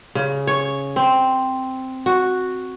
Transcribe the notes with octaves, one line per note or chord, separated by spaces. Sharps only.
C#3
C#5
C4
F#4